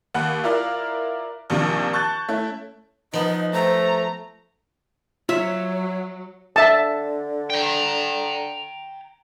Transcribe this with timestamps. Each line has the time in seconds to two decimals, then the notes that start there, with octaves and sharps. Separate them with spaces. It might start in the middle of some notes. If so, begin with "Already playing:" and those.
0.14 D#2 F#5 B5 F#6
0.44 E4 F4 A#4 D5 E5 F5
1.50 A#1 D#2 C3 D4 F4
1.93 A5 C#6 F#6 G6 A6
2.28 A3 C#4 E4
3.13 F3 B3 D#4 D#5
3.53 A3 C5 A#5
5.29 F#3 F4 C#5 E5
6.56 D3 E5 A5
7.50 G5 A#5